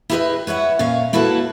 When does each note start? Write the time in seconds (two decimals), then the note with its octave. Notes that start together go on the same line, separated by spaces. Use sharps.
0.10 E4 G4 G#4 A#4 B4 D#5
0.47 B4 C#5 E5 F#5
0.79 A#2 C#4 C#5 F5
1.13 A#3 E4 F#4 A4 B4 A5